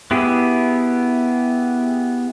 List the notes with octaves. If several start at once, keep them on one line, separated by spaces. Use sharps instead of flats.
B3 E4 G4 G#4